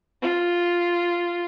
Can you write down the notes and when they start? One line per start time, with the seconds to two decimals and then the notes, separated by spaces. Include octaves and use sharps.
0.22 F4